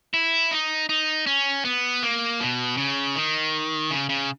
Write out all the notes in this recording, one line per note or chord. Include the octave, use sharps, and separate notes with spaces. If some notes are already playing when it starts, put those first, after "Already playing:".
E4
D#4
D#4
C#4
B3
A#3
B2
C#3
D#3
C#3
C#3